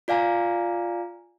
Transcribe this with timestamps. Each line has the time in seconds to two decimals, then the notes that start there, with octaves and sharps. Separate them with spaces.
0.08 F4 D5 F5 G#5 A#5